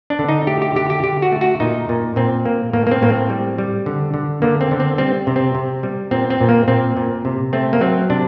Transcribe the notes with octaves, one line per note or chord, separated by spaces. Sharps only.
D4
D3
D#4
A3 G4
G4
D3 G4
G4
D3 G4
F#4
A3
F#4
A#2 D#4
A#2
A#2 C4
A#3
A2 A#3
A#3
C4
A2 A#3
C4
G3
G3
D3
D3
D3 A#3
C4
D3
C4
G3 C4
C3
C4
C3
G3
A#2 C4
C4
A#2
A#3
A#2 C4
A#2
C3
A3 C4
A#3
F#3 C4
C3 D4